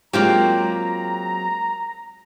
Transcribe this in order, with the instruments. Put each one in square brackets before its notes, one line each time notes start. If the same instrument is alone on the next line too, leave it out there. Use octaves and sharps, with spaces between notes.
[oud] F#3 G#3 C4 [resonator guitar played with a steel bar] A#3 F4 G4 [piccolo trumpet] A#5